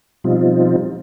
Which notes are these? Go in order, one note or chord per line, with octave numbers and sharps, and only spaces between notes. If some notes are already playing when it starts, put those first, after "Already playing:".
B2 F3 G3 C4 D#4 F4